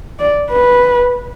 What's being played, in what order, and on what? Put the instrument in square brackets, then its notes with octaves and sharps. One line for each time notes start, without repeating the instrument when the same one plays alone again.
[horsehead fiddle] D5
B4